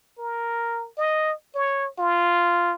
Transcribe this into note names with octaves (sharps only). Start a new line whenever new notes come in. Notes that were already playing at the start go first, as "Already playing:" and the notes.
A#4
D#5
C#5
F4